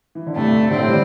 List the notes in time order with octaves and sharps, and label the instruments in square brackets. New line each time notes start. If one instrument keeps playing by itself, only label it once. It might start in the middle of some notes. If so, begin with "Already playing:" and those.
[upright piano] E3
D3
[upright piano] G2 C3 [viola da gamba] A3
[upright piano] A2 D3 [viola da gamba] C4
[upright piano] C3 E3
D3 G3